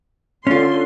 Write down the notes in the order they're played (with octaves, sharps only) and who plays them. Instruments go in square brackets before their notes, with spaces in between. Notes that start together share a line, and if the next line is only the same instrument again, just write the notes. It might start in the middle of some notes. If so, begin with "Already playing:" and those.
[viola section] D3 C6 [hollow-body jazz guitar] C#4 F4